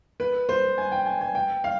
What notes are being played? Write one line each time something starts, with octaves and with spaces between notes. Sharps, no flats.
B4
C5
G#5
G5
G#5
G#5
G5
F5